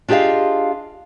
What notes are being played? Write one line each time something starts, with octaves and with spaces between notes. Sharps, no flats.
D4 F4 G4 G#4 D#5 F5